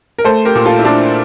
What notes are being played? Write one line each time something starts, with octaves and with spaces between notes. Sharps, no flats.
A#4
A3 A4 C5
G4 A#4
A#2
F4 A4
E4
A3 D4 F4